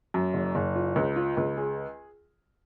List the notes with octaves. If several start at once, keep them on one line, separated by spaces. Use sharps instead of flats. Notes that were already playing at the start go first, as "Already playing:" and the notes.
F#2
F#1
F#1
F4
C#2
F4
C#2
G#4